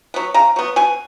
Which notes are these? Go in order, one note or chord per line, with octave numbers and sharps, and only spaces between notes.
F#3 B3
C#3 A#5
F#3 B3
B2 G#5